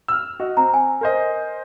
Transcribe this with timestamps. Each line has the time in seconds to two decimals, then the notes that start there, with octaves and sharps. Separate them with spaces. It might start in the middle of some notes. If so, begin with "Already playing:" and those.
0.08 E6 F6
0.40 F#4 D#5
0.57 C4 A#5
0.74 G#5
1.01 A#4 C5 D#5